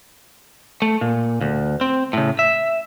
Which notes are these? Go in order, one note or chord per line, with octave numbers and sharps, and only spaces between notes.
A3
A#2
D2
C4
A2 C#3
E5